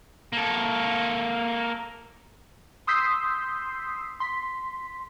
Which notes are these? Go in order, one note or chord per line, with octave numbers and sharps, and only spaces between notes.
A#3 A4
C6 D#6 E6 G6 B6 C7
C6 B6